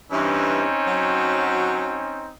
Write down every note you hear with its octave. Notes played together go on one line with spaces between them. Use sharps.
G2 E3 C4 C#4 D#4
F#3